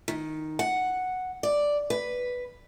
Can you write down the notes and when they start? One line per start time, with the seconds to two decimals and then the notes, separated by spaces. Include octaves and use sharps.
0.08 D#3
0.59 F#5
1.43 D5
1.90 B4